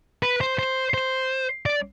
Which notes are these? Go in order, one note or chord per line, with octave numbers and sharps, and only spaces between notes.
B4
C5
C5
C5
D5